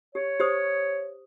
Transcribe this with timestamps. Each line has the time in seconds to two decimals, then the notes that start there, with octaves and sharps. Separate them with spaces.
0.15 G4 C#5
0.40 G4 C5 D#6